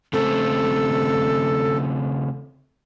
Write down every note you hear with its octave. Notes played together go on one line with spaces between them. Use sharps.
C#3 A3 C4 A4